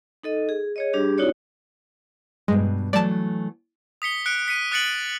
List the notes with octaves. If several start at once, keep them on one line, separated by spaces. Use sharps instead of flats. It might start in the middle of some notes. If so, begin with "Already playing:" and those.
D#4 A4 D#5
G#4
G#4 C#5 D#5
G3 D4 G4 G#4
C4 D#4 E4 F#4 C#5 D5
G2 B2 G#3
E3 F#3 A3 D5 A5
D#6 B6 C#7 G7
F#6 C#7 D7
B6 C#7 D#7
D#6 F#6 A6 C#7 D7 F#7